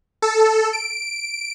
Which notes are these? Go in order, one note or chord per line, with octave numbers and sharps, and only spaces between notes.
A4
D7